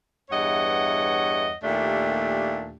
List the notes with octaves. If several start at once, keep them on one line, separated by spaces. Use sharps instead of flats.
E2 G2 C#5 D#5 E5 F#5
D#2 A#2 A3 D4 G4